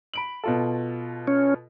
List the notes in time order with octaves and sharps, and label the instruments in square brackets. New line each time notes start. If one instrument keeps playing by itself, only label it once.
[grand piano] B5 D7 F#7
B2 F4 A4
[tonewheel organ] C#4